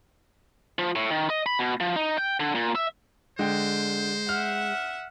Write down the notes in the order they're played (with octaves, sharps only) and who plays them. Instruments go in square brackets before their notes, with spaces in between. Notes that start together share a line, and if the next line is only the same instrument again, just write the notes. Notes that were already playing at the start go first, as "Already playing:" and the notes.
[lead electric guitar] F3
A2
D#3
D#5
B5
B2
F3
D#4
G5
D3
A#2
E5
[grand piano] D3 D4 G5 [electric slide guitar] G#3 [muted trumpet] C5
[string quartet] E5 F#5 [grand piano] F6